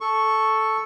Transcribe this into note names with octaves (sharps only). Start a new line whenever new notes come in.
A4 C#6